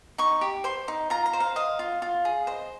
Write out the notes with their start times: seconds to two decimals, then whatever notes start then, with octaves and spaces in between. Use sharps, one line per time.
0.18 D#4 C#6
0.41 G4
0.64 C5 C6
0.88 D#4
1.10 F4 A#5
1.26 A#5
1.33 C5
1.40 F5
1.56 D#5 F5
1.79 F4
2.02 F4
2.25 G#4
2.47 C5 D#5